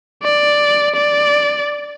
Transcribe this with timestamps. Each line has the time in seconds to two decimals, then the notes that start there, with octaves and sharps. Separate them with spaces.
0.23 D5
0.95 D5